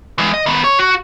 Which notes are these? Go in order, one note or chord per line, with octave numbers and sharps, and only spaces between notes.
E3 G#3
D#5
D#3 B3
C#5
F#4